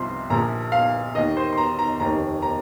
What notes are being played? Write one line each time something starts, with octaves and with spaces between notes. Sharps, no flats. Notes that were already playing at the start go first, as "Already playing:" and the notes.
Already playing: C2 C3 F3 C6
A#1 A#2 F3 A#5
F5
D#2 D#3 D#5
C5
C6
A#5
A#5
F1 D#2 D#3 A#5
A#5